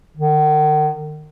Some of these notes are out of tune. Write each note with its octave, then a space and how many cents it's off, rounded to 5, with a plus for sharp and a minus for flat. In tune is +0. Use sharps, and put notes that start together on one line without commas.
D#3 -40